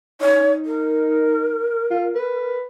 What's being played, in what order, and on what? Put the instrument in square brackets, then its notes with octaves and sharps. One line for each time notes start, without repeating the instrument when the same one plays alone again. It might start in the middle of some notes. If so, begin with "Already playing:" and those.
[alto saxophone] D#4 [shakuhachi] C#5
[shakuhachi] A#4
[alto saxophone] F4
B4